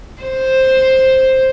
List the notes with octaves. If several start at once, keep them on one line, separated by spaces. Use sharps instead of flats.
C5